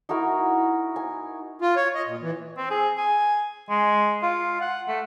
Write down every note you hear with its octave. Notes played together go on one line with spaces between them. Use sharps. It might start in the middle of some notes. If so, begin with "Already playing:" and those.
D#4 E4 F#4 A#4
G#5
F4
C#5
D#5
A#2
E3
C4
G#4
G#5
G#3
F4
F#5
A3